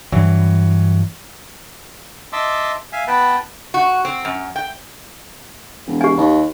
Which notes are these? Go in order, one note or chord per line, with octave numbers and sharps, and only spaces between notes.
G2 E3 F#3 G3
D#5 E5 A5 C6 D6 E6
E5 F5 G#5
B3 B4 G5 A5
F#4
C4
F#2
G5
E1
G4 G#5
D#2